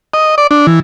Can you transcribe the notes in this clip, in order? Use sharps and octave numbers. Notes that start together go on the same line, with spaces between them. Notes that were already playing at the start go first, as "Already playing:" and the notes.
D#5
D5
D4
E3